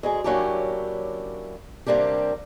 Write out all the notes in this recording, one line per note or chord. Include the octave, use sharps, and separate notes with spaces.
D2 G#3 G#4
F#3 A#3 C#4 D4 E4 G4
C3 G3 A#3 D4 G4